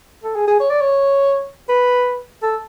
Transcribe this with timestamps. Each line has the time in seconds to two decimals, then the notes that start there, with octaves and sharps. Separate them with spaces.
0.24 A4
0.35 G#4
0.48 G#4
0.60 C#5
0.70 D5
0.81 C#5
1.69 B4
2.43 A4